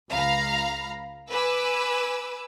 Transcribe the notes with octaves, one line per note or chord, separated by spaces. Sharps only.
C#2 F5 A#5 B5
B4 G#5 D6 E6